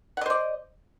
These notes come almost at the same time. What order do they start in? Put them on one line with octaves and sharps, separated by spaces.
F#5 D#5 C5 D5